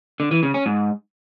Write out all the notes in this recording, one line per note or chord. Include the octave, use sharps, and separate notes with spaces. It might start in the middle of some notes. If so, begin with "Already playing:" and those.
D3
E3
C#3
C#4
G#2